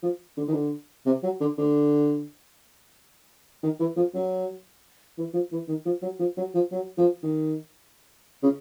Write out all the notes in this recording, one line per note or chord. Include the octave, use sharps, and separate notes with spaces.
F3
D3
D#3
D3
C3
F#3
D3
D3
D#3
E3
F3
F#3
E3
F3
E3
D#3
F3
F#3
F3
F#3
F3
F#3
F3
D#3
C#3